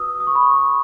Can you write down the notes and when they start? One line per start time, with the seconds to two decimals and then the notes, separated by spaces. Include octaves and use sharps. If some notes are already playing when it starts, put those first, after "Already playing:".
Already playing: F#4 B4 D#6 E6
0.20 D#6
0.27 C#6
0.35 B5
0.42 C#6